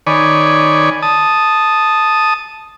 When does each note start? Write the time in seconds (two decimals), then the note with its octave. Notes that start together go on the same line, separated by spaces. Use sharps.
0.07 D#3 C#5 D5 G#5 B5
1.02 A5 D#6